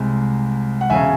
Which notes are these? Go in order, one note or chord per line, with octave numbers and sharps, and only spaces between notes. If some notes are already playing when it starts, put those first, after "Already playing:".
Already playing: C2 C3 G#3
F#5
E1 C#3 E5 G#5